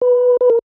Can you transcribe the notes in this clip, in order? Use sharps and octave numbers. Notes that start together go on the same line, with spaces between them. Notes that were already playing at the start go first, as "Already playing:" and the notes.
B4
B4
A#4